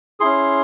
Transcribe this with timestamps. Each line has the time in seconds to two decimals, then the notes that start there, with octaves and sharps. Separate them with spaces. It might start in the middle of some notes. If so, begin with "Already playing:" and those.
0.20 C#4 E4 G#4 C6